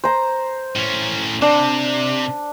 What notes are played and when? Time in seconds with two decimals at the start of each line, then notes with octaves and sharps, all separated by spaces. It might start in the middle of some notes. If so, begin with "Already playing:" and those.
0.04 C5 A#5
0.75 A2 C#4
1.42 C3 D4